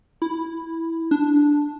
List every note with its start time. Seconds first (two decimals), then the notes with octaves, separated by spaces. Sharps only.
0.22 E4
1.11 D4